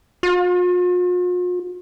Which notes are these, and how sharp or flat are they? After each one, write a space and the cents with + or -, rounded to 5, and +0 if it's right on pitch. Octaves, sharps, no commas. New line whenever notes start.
F4 +45